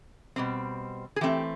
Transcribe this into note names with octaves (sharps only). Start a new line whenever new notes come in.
B2 G3 C4
G#4
E3 A3 C4 G4